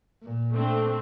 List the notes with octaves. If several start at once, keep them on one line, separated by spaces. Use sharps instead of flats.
A#2
A3 C4 D4